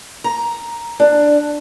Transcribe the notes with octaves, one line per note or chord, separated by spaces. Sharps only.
A#5
D4